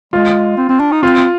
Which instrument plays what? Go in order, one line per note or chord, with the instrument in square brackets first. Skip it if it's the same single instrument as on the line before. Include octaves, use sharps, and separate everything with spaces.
[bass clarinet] G#3 [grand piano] F4
[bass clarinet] C4
C4
D4
D#4
[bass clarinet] C4 [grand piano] F4